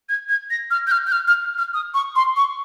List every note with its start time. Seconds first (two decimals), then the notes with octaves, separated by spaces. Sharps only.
0.09 G#6
0.29 G#6
0.50 A#6
0.71 F6
0.87 G6
0.91 F6
1.07 G6
1.12 F6
1.27 F6
1.58 F6
1.74 D#6
1.94 C#6
2.16 C6
2.36 C#6